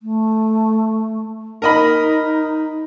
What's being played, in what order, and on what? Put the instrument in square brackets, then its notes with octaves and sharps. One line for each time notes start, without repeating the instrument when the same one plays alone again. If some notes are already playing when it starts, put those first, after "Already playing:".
[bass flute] A3
[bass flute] D#4 [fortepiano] A#4 D#5 B5